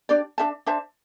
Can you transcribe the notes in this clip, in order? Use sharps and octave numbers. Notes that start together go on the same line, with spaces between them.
D4 G4 D5
D4 C5 E5 A5
D4 C5 E5 A5